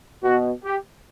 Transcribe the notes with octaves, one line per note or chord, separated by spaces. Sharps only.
B2 F#4
G4